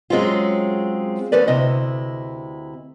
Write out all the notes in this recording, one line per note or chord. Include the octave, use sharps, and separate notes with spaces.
F#3 G#3 C4 C#4 F4
F3 A3 C#4 B4 D5
D2 C3 E4 D#5